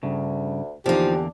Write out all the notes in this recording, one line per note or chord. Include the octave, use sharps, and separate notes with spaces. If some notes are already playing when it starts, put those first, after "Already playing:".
D2 G2 C#3
E2 D3 F3 A#3 D4 D#4 G4